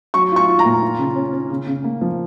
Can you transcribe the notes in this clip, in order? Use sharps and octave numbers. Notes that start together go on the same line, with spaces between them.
F#3 C#6
F4 C#6
F4
A#5
A#2
F4
C#3
C#4
C#4
C#3
C#3
A#3
F3